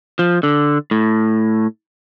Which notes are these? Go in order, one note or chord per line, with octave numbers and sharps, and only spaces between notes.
F3
D3
A2